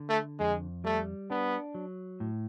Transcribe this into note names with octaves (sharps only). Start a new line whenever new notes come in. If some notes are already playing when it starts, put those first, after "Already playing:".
Already playing: D3
A3
F2 G#3
G3 A3
B3 D4
F#3
A2